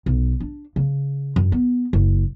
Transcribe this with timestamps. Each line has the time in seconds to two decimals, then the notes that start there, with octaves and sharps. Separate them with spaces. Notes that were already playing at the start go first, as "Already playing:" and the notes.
0.06 B1
0.40 D4
0.76 C#3
1.36 F#2
1.52 B3
1.93 F#1